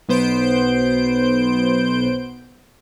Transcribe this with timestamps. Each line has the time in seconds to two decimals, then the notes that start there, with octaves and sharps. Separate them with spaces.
0.09 B1 B3 C5 G6 D7